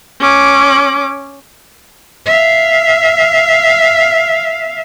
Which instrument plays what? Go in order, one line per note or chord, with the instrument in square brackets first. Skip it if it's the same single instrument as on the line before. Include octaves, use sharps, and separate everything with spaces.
[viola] C#4 D6
[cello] E5 F5